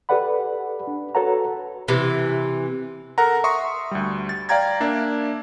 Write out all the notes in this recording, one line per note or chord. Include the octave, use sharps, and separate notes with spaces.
G4 A4 B4 D5 F#5 B5
D4
F#4 A4 B4 C#5 F#5 A#5
C3 E3
A4 A#4 F#5 A#5
E5 C6 C#6 D#6
D2 G3
A6
D5 F5 G5 A#5 G#6 A6
A#3 D4 E5